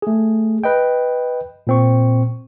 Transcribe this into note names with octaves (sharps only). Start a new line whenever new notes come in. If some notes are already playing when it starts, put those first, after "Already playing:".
A3 G#4
B4 D#5 G5
A#2 C4 C#6